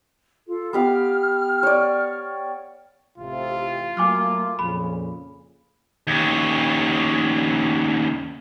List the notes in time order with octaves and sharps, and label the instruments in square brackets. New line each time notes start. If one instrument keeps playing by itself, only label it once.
[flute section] F4 A4
[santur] B3 G4 F5 [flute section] F6
[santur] C#5 D5
[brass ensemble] A1 C3 [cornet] F4
[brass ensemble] F#3 A3 A#3 [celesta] G#5 D6 F6
[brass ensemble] F2 A#2 C#3 [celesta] B5
[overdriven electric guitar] D#2 C#3